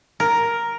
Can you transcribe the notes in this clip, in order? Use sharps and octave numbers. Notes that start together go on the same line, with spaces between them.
A#4